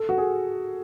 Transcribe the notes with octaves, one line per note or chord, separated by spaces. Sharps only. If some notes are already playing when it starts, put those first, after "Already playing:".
Already playing: A4
F#4
G#4